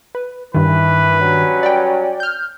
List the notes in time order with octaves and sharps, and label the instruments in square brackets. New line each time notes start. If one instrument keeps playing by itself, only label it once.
[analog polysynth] B4
[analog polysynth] G2 D#3 [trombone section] E3 [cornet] B4
[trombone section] F#3 G3 C#4
[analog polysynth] D5 G5
F6 G6